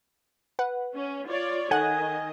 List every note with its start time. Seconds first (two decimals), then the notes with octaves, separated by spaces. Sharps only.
0.59 B4 F#5
0.95 C#4
1.27 F4 C#5 D5
1.71 D#3 A4 D#5 F#5 G#5 F#6